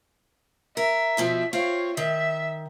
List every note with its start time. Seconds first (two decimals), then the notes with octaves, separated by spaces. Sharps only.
0.77 A#4 E5
1.17 F2 B2 F3
1.53 C4 F4 C#5 F5
1.97 D#3 E5